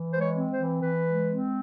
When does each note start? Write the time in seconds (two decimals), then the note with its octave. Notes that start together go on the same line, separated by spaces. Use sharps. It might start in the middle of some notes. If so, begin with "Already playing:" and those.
Already playing: E3
0.12 G#3 C5
0.21 C#5
0.36 C4
0.51 C5
0.60 E3
0.82 E3 B4
1.06 G#3
1.28 C4